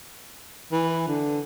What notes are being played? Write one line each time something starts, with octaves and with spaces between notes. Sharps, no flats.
E3
D3